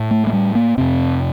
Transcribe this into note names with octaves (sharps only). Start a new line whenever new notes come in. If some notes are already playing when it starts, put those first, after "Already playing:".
Already playing: A2
A3
A3
G3
A#3
F2 C3 C4